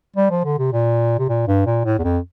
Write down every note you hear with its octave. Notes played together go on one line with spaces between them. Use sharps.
G3
F3
D3
C3
A#2
C3
A#2
G2
A#2
A2
E2
F2